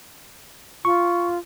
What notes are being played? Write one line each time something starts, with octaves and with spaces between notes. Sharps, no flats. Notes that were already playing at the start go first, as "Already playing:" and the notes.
F4 C#6